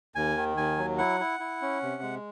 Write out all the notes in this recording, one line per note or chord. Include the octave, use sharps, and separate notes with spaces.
D#2 G#5
D#3
D#2 G#5
F#3
E4 F#5
E4
E4
C#4
C3
G#3